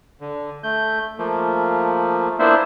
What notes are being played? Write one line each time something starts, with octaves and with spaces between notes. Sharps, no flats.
D3
A3 G6
F3 A3 A#3
A#3 B3 D4 E4 C5 E5